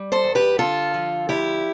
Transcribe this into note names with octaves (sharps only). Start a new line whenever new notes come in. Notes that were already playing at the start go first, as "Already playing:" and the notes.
Already playing: G3
A4 C5
E2
G4 B4
D3 F4 A4
F3
D2 E4 G4